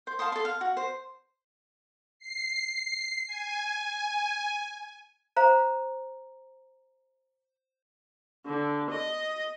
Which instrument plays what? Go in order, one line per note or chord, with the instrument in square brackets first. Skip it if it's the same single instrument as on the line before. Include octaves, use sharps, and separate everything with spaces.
[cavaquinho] C5
F5 A5 C6 D#6
A4 C6
F5
F#4
C5
[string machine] C7
G#5
[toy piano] C5 F5 A#5
[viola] D3
D#5